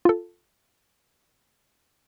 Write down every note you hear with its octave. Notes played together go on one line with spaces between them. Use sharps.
F4 A4